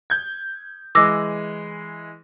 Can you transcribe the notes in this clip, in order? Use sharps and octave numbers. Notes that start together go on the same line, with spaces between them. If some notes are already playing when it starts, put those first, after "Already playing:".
G6 G#6
E3 G#3 D6 E6 A#6